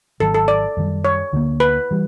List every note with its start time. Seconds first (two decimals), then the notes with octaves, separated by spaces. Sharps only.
0.20 G#1 G#2 D#3 F#3 A4
0.34 A4
0.48 D5
0.77 F#2 D#3 G3
1.05 C#5
1.33 D2 D3 F#3 A#3
1.60 B4
1.91 E3 G3